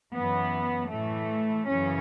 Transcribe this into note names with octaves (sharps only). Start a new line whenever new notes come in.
F#2 E3 B3
A2 E3 A3
F#2 C#3 E3 C#4